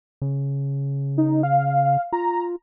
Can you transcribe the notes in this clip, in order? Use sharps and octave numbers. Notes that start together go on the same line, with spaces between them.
C#3
D#4
F5
F4 A#5